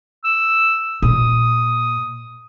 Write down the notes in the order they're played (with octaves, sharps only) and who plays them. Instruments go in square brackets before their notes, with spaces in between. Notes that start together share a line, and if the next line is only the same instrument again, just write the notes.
[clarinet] E6
[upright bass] A#2 [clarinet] D#6